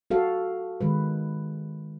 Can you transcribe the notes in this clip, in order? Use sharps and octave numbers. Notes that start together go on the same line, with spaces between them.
F#4 A4 F5
D#3 G#3 B4